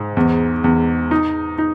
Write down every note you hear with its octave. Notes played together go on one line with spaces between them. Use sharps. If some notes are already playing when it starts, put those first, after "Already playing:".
Already playing: G#2
E2
E2
D#4
D#4